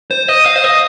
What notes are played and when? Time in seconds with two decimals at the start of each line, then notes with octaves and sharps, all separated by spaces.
0.11 C5
0.28 D#5
0.46 F5
0.56 C5
0.64 D#5